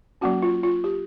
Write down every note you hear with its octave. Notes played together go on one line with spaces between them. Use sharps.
F#3 A#3 C#4 F#4
F4
F4
G4